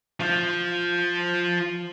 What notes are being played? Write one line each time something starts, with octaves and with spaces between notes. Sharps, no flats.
F3 F4